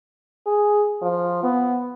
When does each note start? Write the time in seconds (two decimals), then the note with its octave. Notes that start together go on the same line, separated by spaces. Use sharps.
0.46 G#4
1.02 F3
1.43 B3